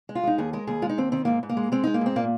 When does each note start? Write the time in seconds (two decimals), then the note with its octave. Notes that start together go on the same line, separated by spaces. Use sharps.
0.09 G#3
0.15 F4
0.23 G#3 D#4
0.38 D#2 G#4
0.53 G#3 A#4
0.67 D#2 G#4
0.82 G#3 F4
0.89 D#4
0.98 D#2 C4
1.12 D#3 C4
1.25 G#2 A#3
1.43 G#2
1.49 A#3
1.57 G#3
1.72 G#3 C4
1.84 G#3 D#4
1.94 A#3
2.01 G#2 C4
2.16 A#2 A#3